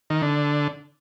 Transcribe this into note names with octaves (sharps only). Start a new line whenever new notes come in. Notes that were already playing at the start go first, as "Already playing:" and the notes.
D#3
D3